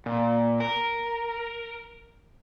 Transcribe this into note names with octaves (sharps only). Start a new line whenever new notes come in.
A#2
A#4